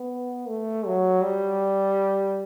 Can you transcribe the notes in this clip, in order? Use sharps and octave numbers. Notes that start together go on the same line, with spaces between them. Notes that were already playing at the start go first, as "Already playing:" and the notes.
Already playing: B3
A3
F#3
G3